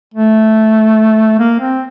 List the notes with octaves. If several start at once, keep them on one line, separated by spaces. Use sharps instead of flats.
A3
A#3
C4